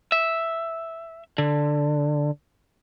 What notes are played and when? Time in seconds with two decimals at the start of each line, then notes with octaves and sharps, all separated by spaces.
0.12 E5
1.38 D3